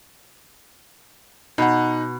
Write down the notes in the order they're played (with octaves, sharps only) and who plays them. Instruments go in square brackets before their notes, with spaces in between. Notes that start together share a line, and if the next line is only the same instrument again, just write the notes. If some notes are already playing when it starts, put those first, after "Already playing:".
[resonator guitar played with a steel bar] B2 [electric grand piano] D#4 F#5